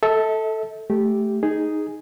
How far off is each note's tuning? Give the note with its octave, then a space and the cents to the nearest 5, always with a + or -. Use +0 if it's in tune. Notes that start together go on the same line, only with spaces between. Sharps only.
A4 +0 E5 -40
A3 -10 G4 +0
D#4 +0 G#4 +0